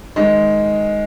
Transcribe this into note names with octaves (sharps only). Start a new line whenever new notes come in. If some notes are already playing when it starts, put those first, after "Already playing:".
D#3 G#3